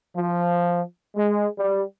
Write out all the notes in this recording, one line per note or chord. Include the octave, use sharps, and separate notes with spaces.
F3
G#3
G3